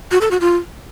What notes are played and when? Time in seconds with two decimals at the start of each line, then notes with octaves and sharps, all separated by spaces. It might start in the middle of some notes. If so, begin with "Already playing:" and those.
0.11 F#4
0.21 A4
0.31 F#4
0.41 F4